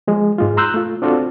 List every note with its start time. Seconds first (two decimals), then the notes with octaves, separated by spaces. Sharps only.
0.08 F3 G#3
0.38 G#2 G#3 F4
0.57 A#5 C6 E6 F#6 G6
0.74 A3 F4
1.02 C4 D4 F4 F#4 A4